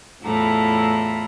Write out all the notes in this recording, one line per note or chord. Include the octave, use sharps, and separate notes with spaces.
E2 A2 E4 F4 A4 A#5